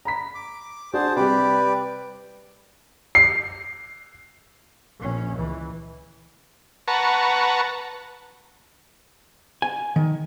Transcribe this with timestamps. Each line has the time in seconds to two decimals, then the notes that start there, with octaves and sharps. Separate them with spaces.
0.05 A#5 B5 B6
0.35 D6
0.93 D4 F#4 G#4 C5 F#5 A5
1.16 C3 G3 G4 B4 D5
3.15 C7
4.98 A#1 C#4
5.37 C#2 E3
6.88 B4 F#5 A5 A#5 C#6
9.62 G#5
9.96 D#3